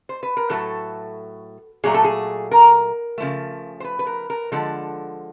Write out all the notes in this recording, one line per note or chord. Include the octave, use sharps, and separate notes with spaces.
C5
B4
A#4
A2 F#3 A3 A4
A#2 F#3 A3 G#4
A4
G#4
A#4
C#3 F3 A3
C5
B4
B4
A#4
A#4
D3 F3 G#3 A4